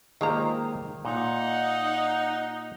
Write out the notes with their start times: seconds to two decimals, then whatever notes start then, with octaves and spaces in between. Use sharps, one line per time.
0.21 D#3 G#3 A#3 F4 C5 A#5
1.05 A#2 D#4 F#5